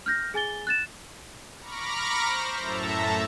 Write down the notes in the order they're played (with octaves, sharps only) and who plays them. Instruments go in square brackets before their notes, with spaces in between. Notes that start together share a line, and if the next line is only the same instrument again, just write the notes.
[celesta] F6 G6 A#6
G#4 G#5 A6 G7
F#6 A6 E7
[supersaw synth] A#5 B5 C#6 D6 F6 A#6
C5
F#2 A2 A4 E5 A5 A#5